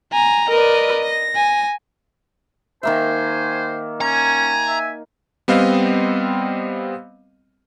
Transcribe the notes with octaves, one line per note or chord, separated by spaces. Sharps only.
G#5 A#5
A#4 B4 D5 D#5
A#6
G#5
D#3 A#3 C5 E5 G#5
C#4 G#5 A#5
E5
G3 B3 C4 D#5 F5